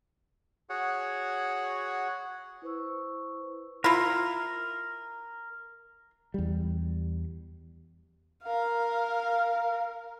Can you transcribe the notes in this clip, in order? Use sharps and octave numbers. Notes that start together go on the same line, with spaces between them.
F#4 G#4 C#5 F#5
E4 B4 C5 C#6 E6
E4 F4 A#4
E2 G3
A#4 F5